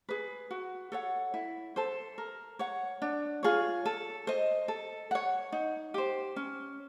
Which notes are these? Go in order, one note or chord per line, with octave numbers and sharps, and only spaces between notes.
G#4 B4
F#4
A4 C#5 F#5
E4
A4 C5
A#4
C#5 F#5
D4
F4 G#4 C#5
A4
C5 D#5
A4
C#5 F#5
D#4
G4 C5
C#4